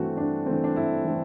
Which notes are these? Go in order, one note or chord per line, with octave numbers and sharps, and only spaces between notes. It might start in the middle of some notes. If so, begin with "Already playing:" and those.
Already playing: G2 E3 A3 C4 F#4
G2 D4
E3 A3 C4
D4
G2 E4
E3 A3 C4